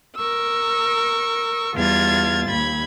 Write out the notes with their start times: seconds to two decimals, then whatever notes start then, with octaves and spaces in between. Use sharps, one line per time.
0.17 A#4 C#6 E6
1.75 E2 G3 F4 F6 G#6 A6
2.49 D#2 B5 G#6